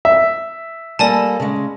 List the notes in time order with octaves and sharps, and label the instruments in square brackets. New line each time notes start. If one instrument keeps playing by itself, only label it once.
[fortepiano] E5
[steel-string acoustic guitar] G3 A#3 A4 [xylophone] D5 G#5 A5
[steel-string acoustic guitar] C#3 G#3